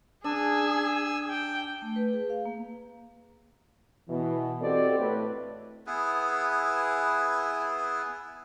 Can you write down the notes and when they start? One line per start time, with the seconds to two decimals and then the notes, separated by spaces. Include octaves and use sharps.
0.24 D4 G#4 G#5 E6
1.30 G5
1.82 A3
1.96 B4
2.13 G#4
2.30 F5
2.45 A#3
4.08 B2 E3
4.60 C4 F#4 G4 A4 D5 D#5
4.98 A2 B4
5.87 B3 E4 G#4 B4